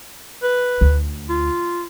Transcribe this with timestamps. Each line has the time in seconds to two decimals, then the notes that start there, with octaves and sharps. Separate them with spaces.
0.43 B4
0.81 D2
1.29 F4